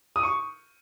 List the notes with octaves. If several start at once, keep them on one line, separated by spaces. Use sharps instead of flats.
D#6
C#6